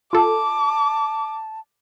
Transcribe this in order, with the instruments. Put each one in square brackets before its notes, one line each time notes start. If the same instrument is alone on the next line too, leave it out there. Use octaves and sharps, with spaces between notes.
[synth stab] F4 A4 [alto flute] A5 [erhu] D6